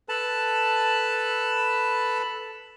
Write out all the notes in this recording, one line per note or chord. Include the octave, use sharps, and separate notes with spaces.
A4 B4 A5 B5